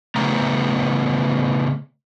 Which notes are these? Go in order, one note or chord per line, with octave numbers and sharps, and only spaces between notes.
C#3 A3 B3 C4 A#5